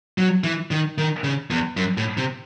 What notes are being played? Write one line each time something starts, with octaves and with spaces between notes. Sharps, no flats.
F#3
E3
D#3
D#3
C#3
E2
F#2
A2
C3